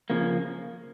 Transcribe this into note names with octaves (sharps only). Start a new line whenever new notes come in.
C#3 F3 A#3